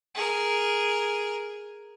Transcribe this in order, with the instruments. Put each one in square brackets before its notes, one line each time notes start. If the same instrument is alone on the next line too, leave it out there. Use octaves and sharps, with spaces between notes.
[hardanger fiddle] G#4 A#4